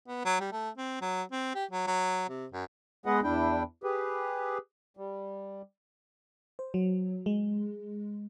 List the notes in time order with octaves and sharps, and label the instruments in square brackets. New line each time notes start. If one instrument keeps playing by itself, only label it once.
[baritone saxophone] B3
F#3
G3
A3
C4
F#3
C4
G4
F#3
F#3
C3
F#2
[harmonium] G#3 B3 G#4 B4 D#5 F#5
E2 D4 E4 G5
G4 G#4 B4
G3
[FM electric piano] C5
F#3
G#3